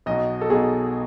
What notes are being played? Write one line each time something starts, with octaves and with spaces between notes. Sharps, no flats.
B1 B2 D#5
A4
B1 B2 G#4